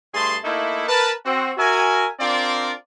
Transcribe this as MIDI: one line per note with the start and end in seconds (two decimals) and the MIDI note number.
0.13 0.37 43
0.13 0.37 57
0.13 0.37 68
0.13 0.37 81
0.13 0.37 84
0.43 0.87 57
0.43 0.87 58
0.43 0.87 63
0.43 0.87 64
0.88 1.11 70
0.88 1.11 71
0.88 1.11 81
1.25 1.52 60
1.25 1.52 66
1.58 2.07 66
1.58 2.07 70
1.58 2.07 76
1.58 2.07 80
2.20 2.72 60
2.20 2.72 62
2.20 2.72 65
2.20 2.72 70
2.20 2.72 74